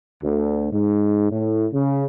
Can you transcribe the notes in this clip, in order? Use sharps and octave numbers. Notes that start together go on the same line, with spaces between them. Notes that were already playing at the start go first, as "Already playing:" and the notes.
D2
G#2
A2
C#3